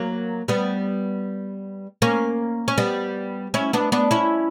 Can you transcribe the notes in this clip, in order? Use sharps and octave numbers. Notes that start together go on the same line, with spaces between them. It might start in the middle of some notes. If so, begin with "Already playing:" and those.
Already playing: F#3 A#3
G3 B3
A#3 C#4
C#4
G3 B3
C#4 E4
B3 D4
B3 D4
C#4 E4